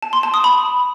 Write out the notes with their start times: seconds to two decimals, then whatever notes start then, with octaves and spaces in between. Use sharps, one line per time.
0.02 A5
0.13 C6
0.23 A5
0.34 D#6
0.44 B5